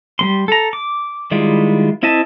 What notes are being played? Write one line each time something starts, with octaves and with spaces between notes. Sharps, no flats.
G3 A#3 C6
A4 A#5
D6
D#3 G3 G#3 E4 F4
C4 E4 D#5 E5 A5